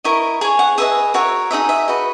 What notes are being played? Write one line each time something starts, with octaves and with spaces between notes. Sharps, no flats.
E4 A#4 D#5 C#6
G#4 C#5 G#5
F#5
G#4 B4 D#5 E5
F#4 A#4 C#5 E5
D#4 G#4 D#5 E5
E5
F#4 B4 D#5